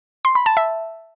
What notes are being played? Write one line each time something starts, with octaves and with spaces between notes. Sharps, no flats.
C6
B5
A5
E5